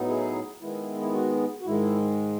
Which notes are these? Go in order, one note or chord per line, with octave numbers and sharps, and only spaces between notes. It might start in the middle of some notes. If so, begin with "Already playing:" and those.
Already playing: A2 F#3 B3 D#4
E4 G#4
D#3 G#3 B3 E4
E4
F#4
F#4
G#2 D#3 G#3 E4